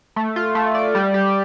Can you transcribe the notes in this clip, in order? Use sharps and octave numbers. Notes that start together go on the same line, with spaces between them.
A3
F4
A3
D5
G3
G4